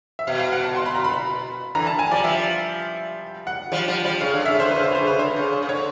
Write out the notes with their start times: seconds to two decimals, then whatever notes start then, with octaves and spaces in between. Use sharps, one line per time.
0.19 E5
0.27 B2 F5
0.40 F5
0.52 F#5
0.64 A5
0.76 C6
0.86 B5
0.95 A#5
1.04 B5
1.75 D3 E3 A#5
1.87 A5
1.99 G#5
2.11 F3 G3 D5
2.24 F3 G3 E5
3.47 F#5
3.72 F3 G3
3.88 F3 G3
4.04 F3 G3
4.21 C#3 F5
4.33 D3
4.45 C#3 E5
4.59 D3 C5
4.71 C#3 B4
4.83 D3 C5
4.95 C#3 C5
5.07 B4
5.19 D3 C5
5.31 C3
5.36 C#3
5.52 C#3
5.63 C#3
5.69 D3 C#5